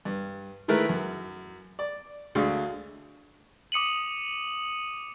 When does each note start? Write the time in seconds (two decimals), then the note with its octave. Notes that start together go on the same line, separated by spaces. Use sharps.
0.05 G2
0.68 D#3 G#3 A3 E4 A#4 B4
0.89 F#2
1.79 D5
2.35 D2 D3 G#3 F5
3.72 D6 D#6 C#7 D#7 F#7